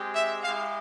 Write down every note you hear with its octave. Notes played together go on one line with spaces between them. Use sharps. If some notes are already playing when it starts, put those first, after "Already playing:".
Already playing: G#3 C4 G4
E5
G#3 E4 G4 F5